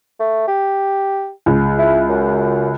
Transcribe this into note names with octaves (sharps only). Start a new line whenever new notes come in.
A3
G4
C#2
E4
F#2